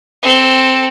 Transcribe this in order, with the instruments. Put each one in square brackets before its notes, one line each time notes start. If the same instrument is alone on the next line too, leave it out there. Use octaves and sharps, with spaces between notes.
[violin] C4 A4